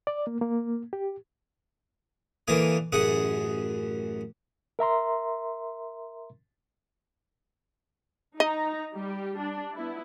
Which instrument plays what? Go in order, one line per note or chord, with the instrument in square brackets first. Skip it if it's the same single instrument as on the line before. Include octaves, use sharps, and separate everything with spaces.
[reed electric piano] D5
A#3
A#3
G4
[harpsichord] D3 E3 A#3 G#5 D#6
A1 F#2 G#4 F#5 D#6
[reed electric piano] A#4 E5 A#5 C6
[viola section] D#4 A#5 [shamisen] D#5
[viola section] G3 G4
D4
B3 E4